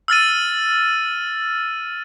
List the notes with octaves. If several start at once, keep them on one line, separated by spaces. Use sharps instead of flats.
E6 F6 A6 D#7